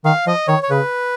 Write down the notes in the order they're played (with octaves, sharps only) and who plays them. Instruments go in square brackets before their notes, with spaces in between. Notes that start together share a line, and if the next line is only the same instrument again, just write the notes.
[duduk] D#3 [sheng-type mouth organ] F5
[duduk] F3 [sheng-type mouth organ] D#5
[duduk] D#3 [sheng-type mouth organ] C#5
[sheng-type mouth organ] C#5
[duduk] C#3 [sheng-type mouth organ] B4